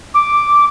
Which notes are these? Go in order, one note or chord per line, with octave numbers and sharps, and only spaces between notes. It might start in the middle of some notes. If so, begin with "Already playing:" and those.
D6